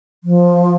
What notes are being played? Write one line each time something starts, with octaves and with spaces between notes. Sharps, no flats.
F3